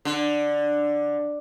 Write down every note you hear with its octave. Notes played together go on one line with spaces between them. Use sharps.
D3